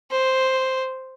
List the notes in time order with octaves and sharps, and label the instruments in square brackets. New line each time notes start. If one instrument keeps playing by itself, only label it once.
[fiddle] C5